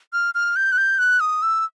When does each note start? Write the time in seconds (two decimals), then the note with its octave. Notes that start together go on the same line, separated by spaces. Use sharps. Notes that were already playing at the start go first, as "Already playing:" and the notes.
0.13 F6
0.35 F6
0.56 G6
0.72 F#6
0.78 G6
0.99 F#6
1.20 D#6
1.42 E6